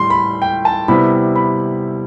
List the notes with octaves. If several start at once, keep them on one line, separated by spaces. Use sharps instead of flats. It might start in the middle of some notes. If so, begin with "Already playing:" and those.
Already playing: A2 G3 C6
B5
G5
A5
C3 G3 B3 E4 B5
B5